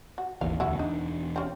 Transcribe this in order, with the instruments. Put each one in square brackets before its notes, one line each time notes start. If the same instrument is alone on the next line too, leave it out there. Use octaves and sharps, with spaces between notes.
[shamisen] F#4
[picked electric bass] G#1 D#2 E3 [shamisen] F5
[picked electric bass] E1 D2 [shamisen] E4 F#4
[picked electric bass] E1 D4 [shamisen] D#4
[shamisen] C4 C#4